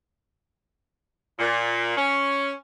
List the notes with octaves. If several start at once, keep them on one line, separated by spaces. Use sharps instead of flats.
A#2
C#4